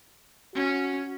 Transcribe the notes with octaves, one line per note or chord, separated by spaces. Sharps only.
C#4 F#4